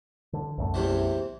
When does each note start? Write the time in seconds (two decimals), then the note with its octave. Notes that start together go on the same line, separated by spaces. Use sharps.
0.33 D3
0.58 B1 F#2 A3
0.74 E2 C3 E3